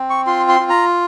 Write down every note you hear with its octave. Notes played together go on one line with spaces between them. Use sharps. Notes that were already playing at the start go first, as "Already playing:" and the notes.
Already playing: C4
C#6
F4 C6
C6
F4
A#5